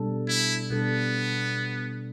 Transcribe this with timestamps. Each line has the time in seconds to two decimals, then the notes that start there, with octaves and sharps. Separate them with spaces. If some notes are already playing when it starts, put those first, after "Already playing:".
Already playing: B2 G3 D4 A4
0.28 E4
0.70 B2 G3 B3 D4 A4